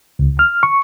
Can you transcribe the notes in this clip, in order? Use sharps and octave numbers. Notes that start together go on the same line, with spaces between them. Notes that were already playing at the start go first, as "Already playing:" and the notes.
C#2
F6
C#6